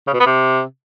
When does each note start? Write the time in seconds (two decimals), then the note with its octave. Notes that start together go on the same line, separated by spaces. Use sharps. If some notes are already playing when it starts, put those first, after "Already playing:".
0.07 C#3
0.13 B2
0.20 B3
0.26 C3